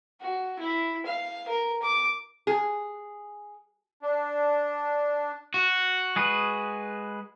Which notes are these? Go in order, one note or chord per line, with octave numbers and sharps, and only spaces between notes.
F#4
E4
F5
A#4
D6
G#4
D4
F#4
G#3 G#4 B4